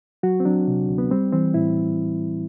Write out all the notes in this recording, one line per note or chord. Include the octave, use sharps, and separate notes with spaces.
F#3 F#4
C4
F#3 D4
C3
D2
B3
G3 C4
E3 C4
A2 E4